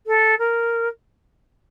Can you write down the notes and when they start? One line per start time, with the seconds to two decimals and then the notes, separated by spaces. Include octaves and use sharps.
0.07 A4
0.39 A#4